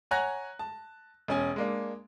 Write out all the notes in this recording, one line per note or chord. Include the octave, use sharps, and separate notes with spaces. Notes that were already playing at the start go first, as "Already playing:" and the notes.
C#5 F#5 G#5 A#5 F#6 A#6
A5
E1 C#4 G#5
G#3 A#3 D4